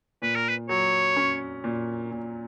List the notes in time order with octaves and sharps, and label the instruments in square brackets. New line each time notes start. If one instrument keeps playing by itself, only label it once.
[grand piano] A#2 [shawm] B4
[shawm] A#4
B4
[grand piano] F#3 [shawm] C#5
[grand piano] C#4
A#2
A#2